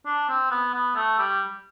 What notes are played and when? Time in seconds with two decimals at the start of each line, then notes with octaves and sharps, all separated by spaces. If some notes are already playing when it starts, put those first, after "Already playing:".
0.06 D4
0.29 C4
0.51 B3
0.73 B3
0.95 A3
1.18 G3